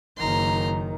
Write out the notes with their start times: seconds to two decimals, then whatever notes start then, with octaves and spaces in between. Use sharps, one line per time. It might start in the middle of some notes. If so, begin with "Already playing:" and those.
0.18 F#1 D#3 A#5 C6